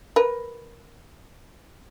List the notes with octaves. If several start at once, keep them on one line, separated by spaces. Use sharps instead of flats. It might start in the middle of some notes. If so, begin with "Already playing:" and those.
A#4 B4